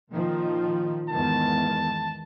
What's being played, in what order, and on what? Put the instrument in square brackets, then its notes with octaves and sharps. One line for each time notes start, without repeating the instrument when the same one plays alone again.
[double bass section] A#2 D#3 F3
[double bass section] E2 G#2 D#3 [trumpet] A5